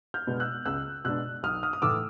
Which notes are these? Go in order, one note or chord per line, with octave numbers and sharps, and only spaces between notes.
F6 G6
B2 G#3 B3 D4
E6 F#6
C#2 E6 F#6
B2 G#3 B3 D4 E6 F#6
B1 D#6 F6
D#6 F6
D#6
A2 E3 A3 D6 E6